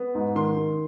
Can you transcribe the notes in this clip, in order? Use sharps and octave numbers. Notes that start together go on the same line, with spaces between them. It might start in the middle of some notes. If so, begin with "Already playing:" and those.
Already playing: B3
G#2
D#3 C6
D#3